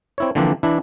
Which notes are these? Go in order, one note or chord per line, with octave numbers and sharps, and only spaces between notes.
C4 E4 C#5
D3 E3 F3 A#3 C4 D4
E3 D4 E4